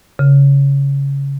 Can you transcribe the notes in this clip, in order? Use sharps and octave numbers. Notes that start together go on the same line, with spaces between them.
C#3